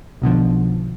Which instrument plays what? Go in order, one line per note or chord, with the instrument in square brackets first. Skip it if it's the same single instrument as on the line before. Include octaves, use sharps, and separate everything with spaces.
[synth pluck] B1 B2 D3 F3